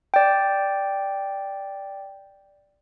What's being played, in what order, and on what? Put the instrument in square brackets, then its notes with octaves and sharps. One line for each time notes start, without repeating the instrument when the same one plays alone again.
[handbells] D5 G5